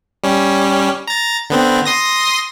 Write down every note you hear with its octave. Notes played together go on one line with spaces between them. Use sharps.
G3 C#4
A#5 A6
D3 B3 C4
C6 D#6 A#6